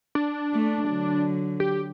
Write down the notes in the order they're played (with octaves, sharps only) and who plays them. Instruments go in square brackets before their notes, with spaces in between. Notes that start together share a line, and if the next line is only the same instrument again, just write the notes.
[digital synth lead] D4
[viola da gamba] A3
D3 F#3
[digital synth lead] G4